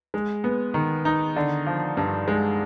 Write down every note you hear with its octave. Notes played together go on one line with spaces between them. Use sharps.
G#3
B3
D#3
D#4
D3
F3
G2
G#3